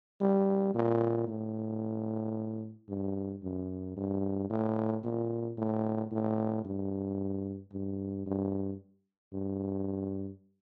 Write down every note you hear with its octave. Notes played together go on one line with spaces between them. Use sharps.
G3
A#2
A2
G2
F#2
G2
A2
A#2
A2
A2
G2
G2
G2
G2